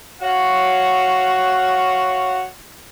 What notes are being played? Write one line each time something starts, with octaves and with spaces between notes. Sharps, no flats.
F#4 C#5 F5